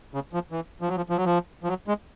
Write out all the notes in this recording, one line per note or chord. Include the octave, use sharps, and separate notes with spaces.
C#3
F3
E3
F3
F#3
F3
F3
F#3
F3
F3
F#3
G#3